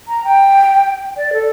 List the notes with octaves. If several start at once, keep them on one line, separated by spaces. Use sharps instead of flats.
A#5
G5
D5
A4